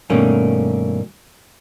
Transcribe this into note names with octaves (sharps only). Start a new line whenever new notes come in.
G2 B2 D#3 A3 A#3 C#4